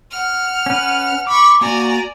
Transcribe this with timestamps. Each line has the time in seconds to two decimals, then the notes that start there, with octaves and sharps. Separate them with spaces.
0.11 F#5 F6
0.66 C#4 B4
1.27 B5 C#6 D6
1.61 A#3 F#4 D5 G#5 A#5